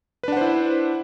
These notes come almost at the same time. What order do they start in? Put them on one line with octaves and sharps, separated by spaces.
B4 D4 F#5 C5 E4